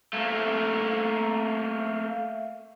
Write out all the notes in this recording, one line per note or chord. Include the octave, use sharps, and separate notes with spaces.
A3 A#3